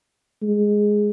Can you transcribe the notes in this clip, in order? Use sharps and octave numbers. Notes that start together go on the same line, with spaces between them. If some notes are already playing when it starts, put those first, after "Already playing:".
G#3